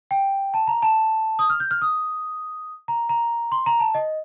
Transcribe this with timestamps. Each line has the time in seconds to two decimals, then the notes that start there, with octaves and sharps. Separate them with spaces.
0.11 G5
0.54 A5
0.67 A#5
0.82 A5
1.39 D#6
1.50 F6
1.60 G6
1.71 F6
1.82 D#6
2.88 A#5
3.09 A#5
3.52 C6
3.66 A#5
3.80 A5
3.95 D#5